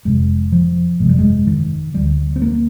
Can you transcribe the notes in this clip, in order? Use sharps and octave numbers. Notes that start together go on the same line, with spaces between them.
F1 F2 C3 G#3
F3
G1 F2 C3 G#3
G3
G#3
D#3
D2 D3 G3
C4
A#3